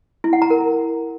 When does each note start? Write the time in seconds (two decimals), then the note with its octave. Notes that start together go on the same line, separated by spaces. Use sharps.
0.24 E4
0.33 F#5
0.42 A#5
0.50 A#4